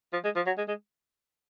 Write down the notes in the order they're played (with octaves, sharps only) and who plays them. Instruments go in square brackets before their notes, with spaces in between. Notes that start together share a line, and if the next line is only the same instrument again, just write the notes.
[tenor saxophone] F3
G#3
F3
F#3
G#3
G#3